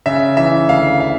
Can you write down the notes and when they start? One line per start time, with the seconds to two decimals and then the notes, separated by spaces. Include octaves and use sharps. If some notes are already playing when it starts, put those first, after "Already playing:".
0.06 C#3 E5
0.37 E3 E5
0.69 D2 F5
1.00 F5